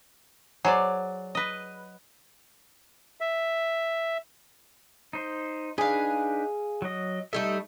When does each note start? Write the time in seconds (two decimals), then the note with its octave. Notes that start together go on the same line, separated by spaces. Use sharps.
0.65 F#3 G#4 C5 D5
1.35 B4 D#5
3.21 E5
5.13 D#4 C5
5.78 D4 D#4 G#4 B4 F5
6.82 F#3 D#5
7.33 G3 A3 D#4 A4 E5